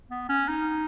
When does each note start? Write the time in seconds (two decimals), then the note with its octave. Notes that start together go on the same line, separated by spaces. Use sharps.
0.10 B3
0.29 C#4
0.48 D#4